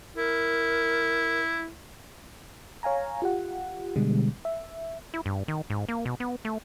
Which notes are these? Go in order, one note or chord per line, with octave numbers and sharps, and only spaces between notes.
E4 A#4
C#5 F5 G#5 A#5
F4 G4 F#5
B2 D3 G3 G#3
E5
E4
G2
D#3
G#2
A#3
B2
B3
A3